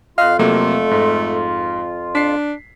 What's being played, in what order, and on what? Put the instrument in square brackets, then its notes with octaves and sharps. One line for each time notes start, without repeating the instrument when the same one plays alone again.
[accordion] F2 F4 [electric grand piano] D#5 F#6 [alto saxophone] F5
[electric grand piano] C3 F#3 A#3 [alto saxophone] A3
[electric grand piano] G#2
[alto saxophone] D4 [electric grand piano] B6 C7